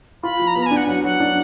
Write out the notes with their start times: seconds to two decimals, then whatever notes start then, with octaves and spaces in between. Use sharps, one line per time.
0.23 F4 B5
0.39 F3
0.47 A#5
0.55 B3 B5
0.62 A#5
0.66 D4 G#5
0.77 F#5
0.88 F#3 F#5
1.04 F#3 F#5
1.20 D4